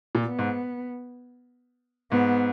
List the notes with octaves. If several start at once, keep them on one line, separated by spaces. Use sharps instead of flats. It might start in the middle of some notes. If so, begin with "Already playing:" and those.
A#2
B3
G#2
G#2 B3